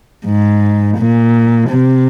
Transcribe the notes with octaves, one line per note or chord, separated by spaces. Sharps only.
G#2
A#2
C3